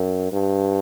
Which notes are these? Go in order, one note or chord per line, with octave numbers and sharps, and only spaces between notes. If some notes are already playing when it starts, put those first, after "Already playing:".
Already playing: F#2
G2